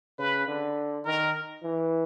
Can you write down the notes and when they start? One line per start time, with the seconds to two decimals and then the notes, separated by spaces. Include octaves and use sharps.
0.19 C#3 B4
0.48 D3
1.05 D#3 A#4
1.63 E3